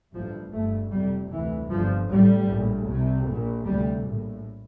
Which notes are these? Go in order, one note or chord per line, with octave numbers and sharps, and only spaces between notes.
A1 G2 F3
G1 G2 A3
F1 F2 C3 G3
D2 C3 E3
G1 G2 F3
A1 A2 G3
A#1 A2
C2 C3
A#1 A#2
D2 C3 G3
A#1 A2